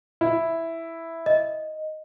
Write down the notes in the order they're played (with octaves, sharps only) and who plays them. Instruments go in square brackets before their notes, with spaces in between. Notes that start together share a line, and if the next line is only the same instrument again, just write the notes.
[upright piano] E4
[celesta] D#5